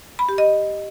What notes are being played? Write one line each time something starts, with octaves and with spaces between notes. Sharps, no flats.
B5
G4
D#5